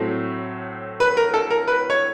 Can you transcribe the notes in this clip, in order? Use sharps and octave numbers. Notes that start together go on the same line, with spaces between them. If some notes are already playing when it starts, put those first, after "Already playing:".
Already playing: A2 F#3 A3 C4
B4
A#4
A4
A#4
B4
C#5